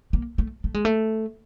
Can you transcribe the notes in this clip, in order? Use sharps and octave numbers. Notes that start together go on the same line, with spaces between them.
A#3
A3
A3
G#3
A3